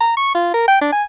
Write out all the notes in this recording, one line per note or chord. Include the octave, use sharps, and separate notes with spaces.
A#5
C#6
F4
A#4
G5
D4
G#5